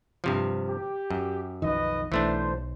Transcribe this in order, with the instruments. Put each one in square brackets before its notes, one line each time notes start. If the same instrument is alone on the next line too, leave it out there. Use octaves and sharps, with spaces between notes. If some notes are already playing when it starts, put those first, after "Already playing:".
[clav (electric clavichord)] G2 C3 F3
[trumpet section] G4
[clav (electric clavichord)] F#2
[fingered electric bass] B1 F2 D#3 [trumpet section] B4 D#5
[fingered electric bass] B1 [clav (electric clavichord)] E3 A3 D4 [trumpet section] C5